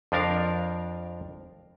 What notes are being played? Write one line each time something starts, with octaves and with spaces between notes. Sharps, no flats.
F2 F3 D4 A#4 F5